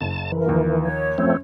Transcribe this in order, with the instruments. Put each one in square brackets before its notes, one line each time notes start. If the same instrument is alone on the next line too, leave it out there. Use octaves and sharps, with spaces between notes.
[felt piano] F#1 [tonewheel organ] A5
[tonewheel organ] E3 [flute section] A#4
[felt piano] D#2 F3 A#3
[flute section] C#5
[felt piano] F#2 [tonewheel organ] F3 A3 C4